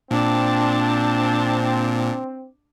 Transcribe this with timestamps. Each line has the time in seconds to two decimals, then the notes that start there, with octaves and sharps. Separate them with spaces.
0.11 A#2 C4 D4 A5